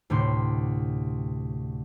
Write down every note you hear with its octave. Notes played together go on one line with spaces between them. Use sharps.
D2 A2 C3 D4 C6